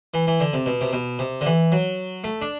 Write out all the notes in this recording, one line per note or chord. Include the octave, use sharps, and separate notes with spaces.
E3
E3
D3
C3
B2
C3
B2
C3
D3
E3
F#3
A3
D4